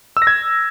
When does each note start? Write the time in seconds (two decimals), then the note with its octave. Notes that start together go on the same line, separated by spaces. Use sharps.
0.17 E6
0.22 A#6
0.27 G#6